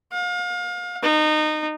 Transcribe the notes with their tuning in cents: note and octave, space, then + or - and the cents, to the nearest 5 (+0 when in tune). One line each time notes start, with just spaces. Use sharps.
F5 +35
D#4 -25